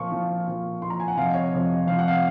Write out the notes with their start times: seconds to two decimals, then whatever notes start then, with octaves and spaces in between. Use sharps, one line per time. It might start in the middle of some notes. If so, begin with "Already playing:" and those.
Already playing: A#2 F3 C#6
0.12 A#2 F3
0.47 A#2 F3
0.82 A#2 F3 C6
0.90 A#5
1.00 G#5
1.08 F#5
1.17 F2 C3 F3 F5
1.26 D#5
1.34 C#5
1.44 D#5
1.52 F2 C3 F3
1.87 F2 C3 F3 F5
1.99 F#5
2.08 F5